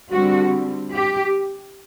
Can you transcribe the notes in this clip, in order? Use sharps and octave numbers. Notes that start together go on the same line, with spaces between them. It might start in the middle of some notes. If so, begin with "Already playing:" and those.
D3 G3 C4 F#4
G4